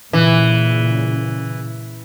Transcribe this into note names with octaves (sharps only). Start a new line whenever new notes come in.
A#2 C#3 E3